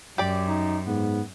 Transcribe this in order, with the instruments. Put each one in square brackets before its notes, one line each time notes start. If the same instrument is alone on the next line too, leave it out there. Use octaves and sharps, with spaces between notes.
[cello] F#2 [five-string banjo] G4 D5
[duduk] D#4
[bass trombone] G#2 [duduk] B3